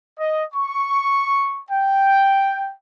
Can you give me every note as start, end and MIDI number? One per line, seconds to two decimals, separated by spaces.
0.18 0.43 75
0.54 1.59 85
1.69 2.72 79